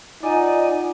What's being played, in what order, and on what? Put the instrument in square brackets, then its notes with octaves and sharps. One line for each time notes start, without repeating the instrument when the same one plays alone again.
[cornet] D#4 [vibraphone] F4 F#5 [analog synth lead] D5 [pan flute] G#5